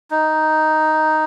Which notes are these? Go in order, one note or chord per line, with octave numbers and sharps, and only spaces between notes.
D#4